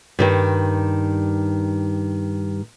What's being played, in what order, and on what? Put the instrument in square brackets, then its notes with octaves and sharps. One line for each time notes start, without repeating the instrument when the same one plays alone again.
[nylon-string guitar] G2 D#3 G3